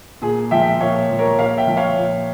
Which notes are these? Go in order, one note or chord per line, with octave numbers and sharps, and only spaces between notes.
A#2 G#4
F3 E5 G5
A#2 C#5 F5
F3
A#4 C#5
A#2 C#5 F5
E5 G5
F3
C#5 F5
A#2